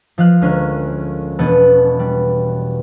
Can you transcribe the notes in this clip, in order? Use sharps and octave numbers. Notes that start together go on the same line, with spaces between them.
F3 F5 F#6
D2 G#3 C#4 A#4
E1 B2 B3 A5
G3